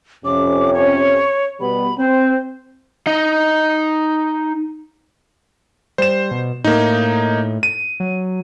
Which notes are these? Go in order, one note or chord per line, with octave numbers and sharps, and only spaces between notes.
F2 C3 C#4 D6
C#5
B2 G3 B3 B5
C4 C5
D#4 D#5
G3 C5 E7
B2
A2 A#3 D#4
D#7
F#3